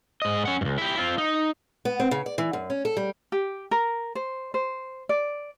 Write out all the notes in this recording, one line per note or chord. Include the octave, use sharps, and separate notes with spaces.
G#2 D#5
C#4 F#5
C#2 G2
E4 G4
C4 F4
D#4
B3
C4
C#3
D5
E3
F#2
C#4
A4
G3
G4
A#4
C5
C5
D5